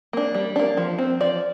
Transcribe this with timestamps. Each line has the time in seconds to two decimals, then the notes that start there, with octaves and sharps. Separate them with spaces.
0.13 A#3 D4
0.35 G3
0.56 A#3 D4
0.77 F3
0.98 C4
1.20 F3 D5